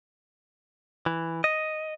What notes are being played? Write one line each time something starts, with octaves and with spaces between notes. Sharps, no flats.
E3
D#5